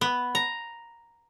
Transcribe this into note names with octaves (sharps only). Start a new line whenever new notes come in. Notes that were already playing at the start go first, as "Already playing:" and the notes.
B3
A#5